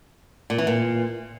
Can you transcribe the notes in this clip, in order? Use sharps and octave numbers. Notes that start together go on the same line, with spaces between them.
A#2
E3
A#2